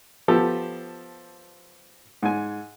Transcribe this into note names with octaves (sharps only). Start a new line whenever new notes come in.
F3 B3 G4 A4
G#2 G#5